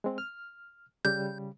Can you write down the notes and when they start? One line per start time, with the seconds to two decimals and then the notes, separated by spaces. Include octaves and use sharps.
0.04 G#3 C4
0.18 F6
1.05 C#3 G3 G6